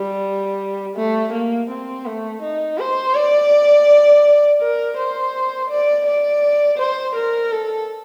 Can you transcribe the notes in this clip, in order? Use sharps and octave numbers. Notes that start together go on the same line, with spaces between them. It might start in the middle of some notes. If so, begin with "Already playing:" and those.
Already playing: G3
A3
A#3
C4
A3
D#4
C5
D5
A#4
C5
D5
D5
C5
A#4
A4